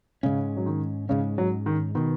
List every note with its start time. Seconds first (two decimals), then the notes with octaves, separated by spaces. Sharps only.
0.23 G#2 C#3 G#3 C#4
0.57 F#3
0.66 D#3
1.09 G#2 C#3 G#3 C#4
1.38 F#3
1.66 D#3
1.95 B2 D#3 B3